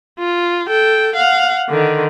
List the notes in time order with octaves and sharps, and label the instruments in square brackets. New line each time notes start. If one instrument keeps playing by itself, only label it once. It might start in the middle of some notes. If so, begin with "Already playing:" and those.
[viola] F4
A4 G5
F5 F#5
D3 D#3